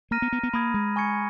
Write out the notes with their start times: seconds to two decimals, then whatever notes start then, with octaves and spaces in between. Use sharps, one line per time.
0.11 A#3 A#5 F6 A#6 D#7
0.22 B3
0.32 B3
0.43 B3
0.53 A#3 B5 D#6 G#6
0.74 G#3
0.96 G#5 C#6 G#6 C#7